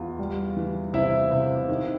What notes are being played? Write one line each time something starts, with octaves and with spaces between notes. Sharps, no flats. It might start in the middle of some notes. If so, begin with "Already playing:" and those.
Already playing: E2 F4
G3
E3
C3 E4 E5
C3
D#3